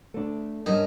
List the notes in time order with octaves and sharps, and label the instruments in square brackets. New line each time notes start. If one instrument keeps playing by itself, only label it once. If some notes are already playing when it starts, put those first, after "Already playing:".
[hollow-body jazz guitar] A3 D4
[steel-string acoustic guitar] G2 C#4 [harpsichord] D#4 [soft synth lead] A#4